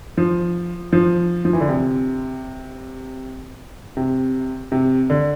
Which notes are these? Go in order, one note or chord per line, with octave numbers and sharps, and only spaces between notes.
F3
F3
F3
E3
D3
C3
C3
C3
D3